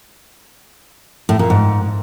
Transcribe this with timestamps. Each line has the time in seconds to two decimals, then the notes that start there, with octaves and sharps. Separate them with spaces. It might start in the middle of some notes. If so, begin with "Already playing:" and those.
1.29 A2
1.39 A#2
1.50 G#2